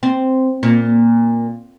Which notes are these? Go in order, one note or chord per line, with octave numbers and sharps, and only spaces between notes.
C4
A#2